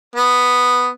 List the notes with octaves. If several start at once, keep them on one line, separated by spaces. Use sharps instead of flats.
B3